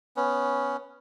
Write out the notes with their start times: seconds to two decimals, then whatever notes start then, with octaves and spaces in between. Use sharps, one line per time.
0.17 B3 C#4